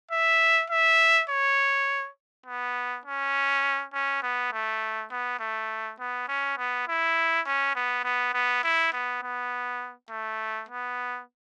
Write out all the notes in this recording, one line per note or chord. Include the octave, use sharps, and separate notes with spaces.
E5
E5
C#5
B3
C#4
C#4
B3
A3
B3
A3
B3
C#4
B3
E4
C#4
B3
B3
B3
E4
B3
B3
A3
B3